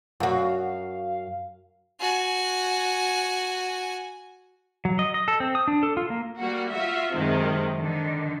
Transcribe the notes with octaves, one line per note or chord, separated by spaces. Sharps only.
F#2 F#4 F5
F#4 G#5
F#3
D#5
D#5
A4
C4
D#6
D4
A4
F4
A#3
G3 A#3 F#4
F4 F#4 E5
F#2 C3 D#3 G#3
D3 D#3